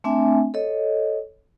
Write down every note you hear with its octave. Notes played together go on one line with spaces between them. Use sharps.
A3 C4 D4 E5 G#5
A4 C#5 D#5